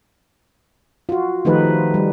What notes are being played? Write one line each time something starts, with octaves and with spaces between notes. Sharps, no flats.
F4 F#4
D#3 F3 A3 D#4 G4 B4
G3